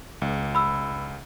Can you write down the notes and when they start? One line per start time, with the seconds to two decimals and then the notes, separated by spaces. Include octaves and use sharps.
0.22 C#2
0.55 B5 E6